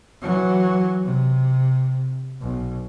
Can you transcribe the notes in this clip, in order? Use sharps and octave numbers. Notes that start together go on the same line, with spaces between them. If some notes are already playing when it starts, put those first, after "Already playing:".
E3 F#3
C3
B1